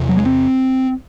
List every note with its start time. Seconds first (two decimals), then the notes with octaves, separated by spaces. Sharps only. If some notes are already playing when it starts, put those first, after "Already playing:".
Already playing: E2 C3
0.09 F#3
0.17 G#3
0.26 C4